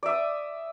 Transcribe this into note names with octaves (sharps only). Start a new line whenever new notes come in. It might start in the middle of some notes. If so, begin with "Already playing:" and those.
D5 E5 D#6